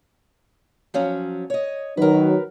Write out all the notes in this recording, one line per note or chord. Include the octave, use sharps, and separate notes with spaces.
F3 F#3 C#4
C#5 D#5
D#3 F#3 D#4 A#4 B4